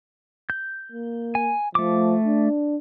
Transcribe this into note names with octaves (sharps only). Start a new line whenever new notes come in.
G6
A#3
G#5
F3 A3 D6
D4